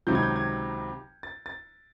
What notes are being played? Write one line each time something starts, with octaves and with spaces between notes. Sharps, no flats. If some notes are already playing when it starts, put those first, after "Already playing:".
C#2 C3 D#3 F#3 G6
G#6
G6
G#6
A6
A6